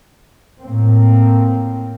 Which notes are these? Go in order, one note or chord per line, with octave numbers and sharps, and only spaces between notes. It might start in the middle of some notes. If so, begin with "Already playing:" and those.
A2 A#3 C4